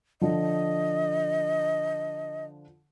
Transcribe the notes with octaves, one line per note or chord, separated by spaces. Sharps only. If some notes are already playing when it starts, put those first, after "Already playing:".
D3 F3 D#5